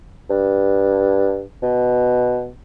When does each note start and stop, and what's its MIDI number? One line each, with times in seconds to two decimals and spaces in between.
0.30 1.42 43
1.63 2.49 47